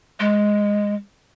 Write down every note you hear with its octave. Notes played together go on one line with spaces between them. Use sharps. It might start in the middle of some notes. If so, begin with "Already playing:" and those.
G#3